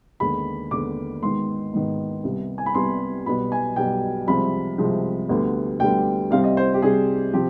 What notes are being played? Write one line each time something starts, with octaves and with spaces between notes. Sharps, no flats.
D#2 D3 G#3 B3 B5
D#2 D3 G#3 B3 D6
G#1 G#2 D#3 B3 C6
G#1 G#2 D#3 B3
C2 C3 G3 B3
G#5
B5
C2 C3 G3 B3 C6
B1 B2 G3 B3 B5
G#5
B1 B2 G3 B3 G5
C2 C3 F3 G#3 C4 B5
C2 C3 F3 G#3 C4
D2 D3 G3 B3
D2 D3 G3 B3 G5
C2 C3 G3 C4 F5
D#5
C5
G4
C2 C3 G3 C4 G#4
C3 F3 C4 G4